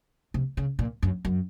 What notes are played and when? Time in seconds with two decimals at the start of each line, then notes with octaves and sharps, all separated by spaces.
0.34 C3
0.57 C#3
0.79 A#2
1.03 F#2
1.25 F#2